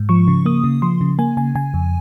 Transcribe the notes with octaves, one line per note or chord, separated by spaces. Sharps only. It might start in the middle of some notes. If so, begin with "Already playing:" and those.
Already playing: G#2
F3 C#6
C#3
A#3 D#6
C#3
F3 C6
C#3
A#3 G#5
C#3 G#5
C#3 G#5
F2